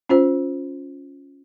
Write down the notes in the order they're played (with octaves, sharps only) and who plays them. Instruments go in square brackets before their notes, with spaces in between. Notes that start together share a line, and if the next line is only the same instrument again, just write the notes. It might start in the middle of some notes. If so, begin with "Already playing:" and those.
[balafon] C#4 F4 C5